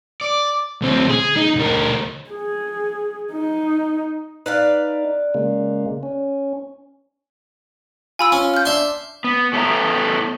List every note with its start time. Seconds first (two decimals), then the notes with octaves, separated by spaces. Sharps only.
0.21 D5
0.82 D2 C4
1.10 G#4
1.36 D#4
1.56 D2 A#4
2.30 G#4
3.32 D#4
4.46 D#4 B4 D5 F5
5.34 C#3 G#3 A#3
6.03 C#4
8.19 F4 G#5 B5 E6
8.32 C#4
8.54 F6 G6
8.65 D4 E5 C6
9.24 B3
9.53 A2 A3 B3 E5 A#5